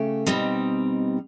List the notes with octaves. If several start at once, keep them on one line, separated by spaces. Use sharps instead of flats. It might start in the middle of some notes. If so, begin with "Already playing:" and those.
Already playing: C#3 A3 G4
B2 G3 C4 D#4